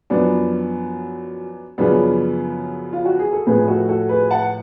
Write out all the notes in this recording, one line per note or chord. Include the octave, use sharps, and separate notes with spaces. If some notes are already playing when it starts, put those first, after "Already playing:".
F#2 F3 B3 D4
F#2 C#3 F3 B3 D4
F4
F#4
G#4
A4
A2 F3 G#4 B4
F#4 A4
F#4 A4
G#4 B4
F#5 A5